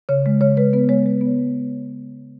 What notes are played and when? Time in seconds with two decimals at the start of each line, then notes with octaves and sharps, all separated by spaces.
0.09 C#3 C#5
0.26 G#3
0.41 C#3 C#5
0.57 G#3 B4
0.73 B3 B4
0.89 G#3 C#5
1.06 G#3
1.21 B3